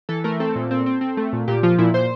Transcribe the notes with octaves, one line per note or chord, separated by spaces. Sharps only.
E3 A4
A3 A#4
C4 A4
A#2
C4
C4
C4
A3
A#2
A#2 G4
F3 F4
A#2 E4
A#2 C5